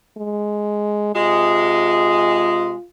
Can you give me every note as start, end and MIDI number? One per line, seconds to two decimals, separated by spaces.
0.18 1.14 56
1.15 2.72 48
1.15 2.72 56
1.15 2.85 65